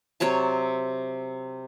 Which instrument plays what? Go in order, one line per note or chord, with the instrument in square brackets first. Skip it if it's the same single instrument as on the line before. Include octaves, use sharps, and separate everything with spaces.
[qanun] C3 F#3 C#5 A5